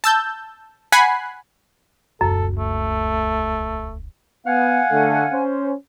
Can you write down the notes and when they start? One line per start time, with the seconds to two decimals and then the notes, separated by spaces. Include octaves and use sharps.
0.04 A5 E6 G6
0.92 F#5 G#5 B5 F#6 C7
2.21 D#1 C#2 F#2 A4
2.58 A3
4.46 B3 F5 F#5 G#5
4.91 D3 A3
5.31 C#4 C5